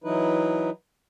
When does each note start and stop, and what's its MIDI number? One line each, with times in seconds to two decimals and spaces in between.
0.04 0.70 52
0.04 0.70 54
0.04 0.70 63
0.04 0.70 64
0.04 0.70 71